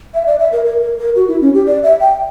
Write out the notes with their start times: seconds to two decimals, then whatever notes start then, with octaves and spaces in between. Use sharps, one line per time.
0.14 E5
0.27 D5
0.39 E5
0.52 A#4
0.65 A#4
0.82 A#4
0.98 A#4
1.16 F#4
1.28 E4
1.41 C#4
1.54 G4
1.67 D5
1.83 E5
2.01 G5